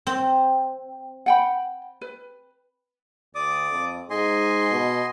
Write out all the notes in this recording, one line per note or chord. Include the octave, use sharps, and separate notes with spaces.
C4
F#5 G5 B5
B4
D2 D5 D6 D#6
F2
G#2 D#5 G#5 C6
B2